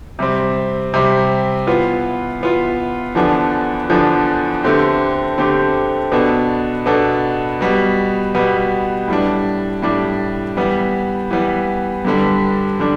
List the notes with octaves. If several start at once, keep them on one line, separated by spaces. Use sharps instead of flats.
C3 G3 C4
C3 G3 C4
E3 B3 F4
E3 B3 F4
E2 D3 F3 B3 D4
E2 D3 F3 B3 D4
D3 A3 C4 G4
D3 A3 C4 G4
B2 B3 D4 A4
B2 B3 D4 A4
B2 G3 B3
B2 G3 B3
A2 G3 D4
A2 G3 D4
E3 G3 B3
E3 G3 B3
G2 D3 G3 D4
D3 G3 D4